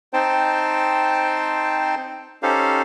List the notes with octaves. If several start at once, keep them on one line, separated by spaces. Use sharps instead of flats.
C4 D#4 C5 G5 A5
C#4 D#4 G4 A4 C5 F5